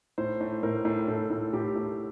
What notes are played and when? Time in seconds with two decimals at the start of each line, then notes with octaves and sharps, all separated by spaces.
0.18 A2 C5
0.41 A2
0.63 A2 A#4
0.85 A2
1.08 A2 A4
1.30 A2
1.53 A2 G4
1.75 A2